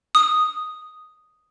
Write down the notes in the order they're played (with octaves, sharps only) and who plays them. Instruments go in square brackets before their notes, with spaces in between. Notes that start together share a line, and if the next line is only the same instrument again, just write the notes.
[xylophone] D#6